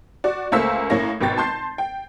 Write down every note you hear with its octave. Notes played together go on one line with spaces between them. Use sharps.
F#4 D5
C#2 A3 A#3 C5 E6 B6
A2 A#3 C#4 A#6
G#1 B2 G5 A6
A5 C6 G6 C7
G5